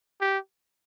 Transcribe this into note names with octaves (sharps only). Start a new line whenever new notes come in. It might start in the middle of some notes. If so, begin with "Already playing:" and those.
G4